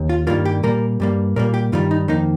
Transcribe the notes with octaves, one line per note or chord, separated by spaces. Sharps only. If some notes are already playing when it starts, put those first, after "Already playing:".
Already playing: D#2
F4
G2 D#3 G3 A#3 F4
G4
A#2 G3 A#3 A#4
G2 G3 A#3
A#2 G3 A#3 A#4
G4
G2 D#3 G3 F4
D#4
F2 D#3 A#3 D#4